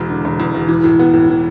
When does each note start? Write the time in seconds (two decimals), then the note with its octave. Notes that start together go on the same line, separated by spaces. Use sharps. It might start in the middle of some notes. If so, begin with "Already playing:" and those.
Already playing: E1 E2
0.10 D3
0.25 E1
0.40 E2
0.54 E1
0.69 E3
0.84 A2
0.99 B3
1.14 A2
1.29 E3